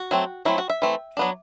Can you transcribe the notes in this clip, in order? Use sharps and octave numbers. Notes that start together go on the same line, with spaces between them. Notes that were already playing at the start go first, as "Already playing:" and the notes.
Already playing: F#4
F#3 A3 C4
F#3 A3 C4 E4
F#4
E5
E3 A3 C4
F#3 B3 D4